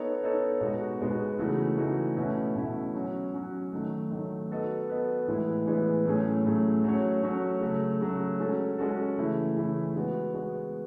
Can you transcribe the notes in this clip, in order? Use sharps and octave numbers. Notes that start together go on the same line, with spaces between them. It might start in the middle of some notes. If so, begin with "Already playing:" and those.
Already playing: B3 D#4 A4 C#5
B3 D#4 A4 C#5
B2 G#3 B3 D#4 F#4
B2 G#3 B3 D#4 F#4
C#3 E3 A3 D#4 F#4
C#3 E3 A3 D#4 F#4
B2 A3 C#4 E4
B2 A3 C#4 E4
F#3 C#4 F#4
F#3 C#4 F#4
D#3 F#3 A3
D#3 F#3 A3
B3 F#4 A4 D#5
B3 F#4 A4 D#5
A2 E3 G#3 B3 E4
A2 E3 G#3 B3 E4
A2 F#3 A3 C#4 G#4
A2 F#3 A3 C#4 G#4
F#3 A3 C#4 F#4 C#5
F#3 A3 C#4 F#4 C#5
C#3 F#3 A3
C#3 F#3 A3
G#3 C#4 F#4 A4
G#3 C#4 F#4 A4
C#3 E3 A3 E4
C#3 E3 A3 E4
G#3 B3 F#4
G#3 B3 F#4